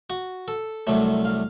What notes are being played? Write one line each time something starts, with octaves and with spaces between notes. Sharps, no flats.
F#4
A4
C2 C3 F#3 A3
F5